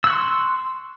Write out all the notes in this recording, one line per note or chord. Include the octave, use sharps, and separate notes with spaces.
C6 C#6 E6 F#6